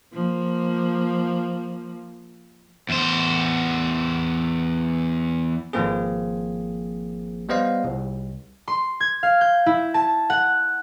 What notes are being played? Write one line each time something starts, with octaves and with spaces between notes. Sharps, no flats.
F3 A#3
E2 C5
G#1 F3 A#3 C4 G#4
G3 B3 C5 D#5 F5
C2
C6
G#6
F5
G6
E4
A5
F#5